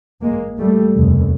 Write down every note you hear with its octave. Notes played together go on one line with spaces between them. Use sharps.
G#1 G#2 G#3 A#3
G3 A3
F1 D#2 C#3